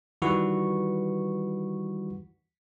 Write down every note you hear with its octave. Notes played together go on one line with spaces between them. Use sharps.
D#3 E3 G3 F#4 B4 C#6